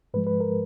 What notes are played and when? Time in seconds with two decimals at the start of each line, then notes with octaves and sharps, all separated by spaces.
0.14 G#2 F3 G#3 B4
0.27 B4
0.40 A#4